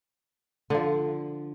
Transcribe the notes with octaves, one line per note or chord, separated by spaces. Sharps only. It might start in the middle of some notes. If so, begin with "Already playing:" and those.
D3 F3